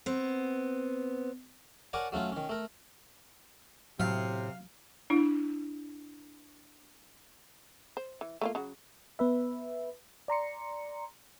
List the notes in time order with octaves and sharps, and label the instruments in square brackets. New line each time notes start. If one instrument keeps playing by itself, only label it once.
[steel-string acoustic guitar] B3 C4
[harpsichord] A#4 C#5 D5 F#5 G#5 A5
F#3 A3 C#4 F4
D#3 C#4
A3 A#4
[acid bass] A2 [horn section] C3 [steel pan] F#3 [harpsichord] F5
[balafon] D4 E4
[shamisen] C5
E3
A3 A#3 F4
C#3 F#3 F#4
[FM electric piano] B3 B4 E5
D5 A#5 C6 C#7